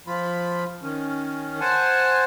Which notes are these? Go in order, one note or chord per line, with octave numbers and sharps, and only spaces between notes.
F3 F4 B5
D#3 C#4
C5 F#5 G#5 A5